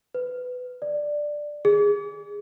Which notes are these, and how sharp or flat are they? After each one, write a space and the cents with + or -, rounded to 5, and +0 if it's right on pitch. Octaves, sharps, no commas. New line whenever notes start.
B4 +15
D5 +10
G#4 -15